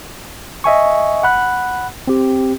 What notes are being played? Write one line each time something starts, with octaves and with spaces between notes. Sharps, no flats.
D#5 E5 G#5 C#6
F#5 B5 F#6
C4 G4